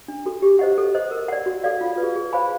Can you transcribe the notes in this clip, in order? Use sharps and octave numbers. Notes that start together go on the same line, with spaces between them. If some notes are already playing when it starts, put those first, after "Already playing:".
D4
F#4 A4
G4
C5 D#5 F#5
A4
C5 D#5
A#4
D5 F#5
F#4
A4 D5 F5
F4
B4
G#4
G#4
C5 F5 G#5 B5